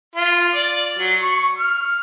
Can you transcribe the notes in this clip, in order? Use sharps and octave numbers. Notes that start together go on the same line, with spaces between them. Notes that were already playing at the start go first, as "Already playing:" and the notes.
F4
D5
F#3
C#6
F6